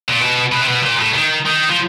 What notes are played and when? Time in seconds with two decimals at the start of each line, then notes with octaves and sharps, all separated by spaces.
0.09 A#2
0.20 B2
0.52 B2
0.61 C3
0.68 B2
0.83 A#2
0.99 A2
1.14 D#3
1.45 D#3
1.70 F3